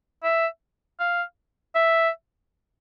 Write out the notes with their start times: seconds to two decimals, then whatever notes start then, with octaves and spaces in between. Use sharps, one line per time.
0.24 E5
1.00 F5
1.75 E5